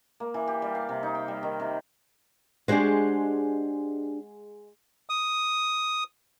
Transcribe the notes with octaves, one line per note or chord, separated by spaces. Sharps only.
A#3
E3
G4
G3
F5
C3
D#4
G5
G3
D#3
C3
G#3 D4 F#4 G4 C5
D#6